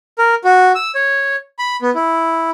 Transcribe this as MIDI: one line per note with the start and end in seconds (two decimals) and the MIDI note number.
0.19 0.35 70
0.44 0.72 66
0.75 0.91 88
0.95 1.36 73
1.59 1.76 83
1.82 1.91 59
1.95 2.51 64